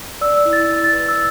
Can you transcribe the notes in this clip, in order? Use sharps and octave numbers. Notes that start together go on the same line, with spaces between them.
D5 E6
E4
A6
E4
A6
B4
E6